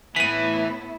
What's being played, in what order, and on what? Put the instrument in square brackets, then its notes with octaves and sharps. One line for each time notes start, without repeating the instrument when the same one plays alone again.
[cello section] A2 B3 [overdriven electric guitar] E3 [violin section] E4 [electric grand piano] B6 D#7